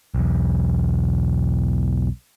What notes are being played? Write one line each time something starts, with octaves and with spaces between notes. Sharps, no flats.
B1 E2